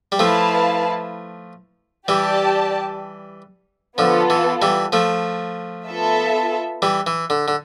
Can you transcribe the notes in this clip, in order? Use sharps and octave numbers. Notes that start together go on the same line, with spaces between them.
G3
F3 A3 E4 B4 F5 A5
E3 G3 G4 D5 A5
D3 F3 B3 F4 A4
E3
E3 G3
F3 A3
B3 F4 A4 E5
E3 G3
E3
D3
D3